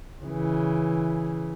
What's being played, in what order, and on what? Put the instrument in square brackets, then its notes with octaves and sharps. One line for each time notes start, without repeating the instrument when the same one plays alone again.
[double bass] C#3 E3